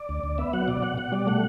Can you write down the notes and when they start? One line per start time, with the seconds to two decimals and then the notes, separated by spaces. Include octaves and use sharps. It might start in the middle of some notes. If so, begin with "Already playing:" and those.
Already playing: D5
0.09 D2
0.24 D2
0.38 B3 E5
0.53 F#3 F#5
0.68 B2 D5
0.82 B2 F#5
0.98 B2 F#5
1.12 G3 D5
1.27 A3 F#5